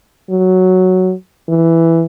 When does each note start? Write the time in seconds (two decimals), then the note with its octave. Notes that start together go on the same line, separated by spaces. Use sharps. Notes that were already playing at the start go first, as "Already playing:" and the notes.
0.30 F#3
1.49 E3